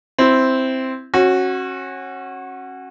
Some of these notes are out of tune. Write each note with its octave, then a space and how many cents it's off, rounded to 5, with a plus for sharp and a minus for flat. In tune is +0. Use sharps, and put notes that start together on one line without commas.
C4 +0 E4 +0
C#4 -30 F#4 +0